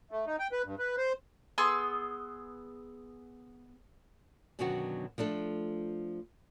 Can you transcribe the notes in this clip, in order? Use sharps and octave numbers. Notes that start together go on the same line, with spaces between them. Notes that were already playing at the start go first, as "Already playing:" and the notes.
A3
D#4
G5
B4
G2
B4
C5
B3 G#4 C6 E6
F#2 B2 D3 D#3 F#3 F#4
F3 A3 D4 A4